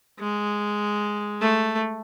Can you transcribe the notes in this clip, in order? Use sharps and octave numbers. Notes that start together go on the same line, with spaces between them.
G#3
A3